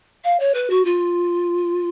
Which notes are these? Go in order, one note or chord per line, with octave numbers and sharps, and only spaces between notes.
F5
C#5
B4
F#4
F4